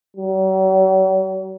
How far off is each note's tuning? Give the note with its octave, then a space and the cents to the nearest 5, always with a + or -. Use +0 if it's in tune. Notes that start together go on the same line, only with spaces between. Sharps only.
F#3 +45